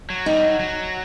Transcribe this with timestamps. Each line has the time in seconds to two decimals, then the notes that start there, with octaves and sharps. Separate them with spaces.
0.10 F#3
0.26 G3 D#4
0.43 F#3
0.60 F#3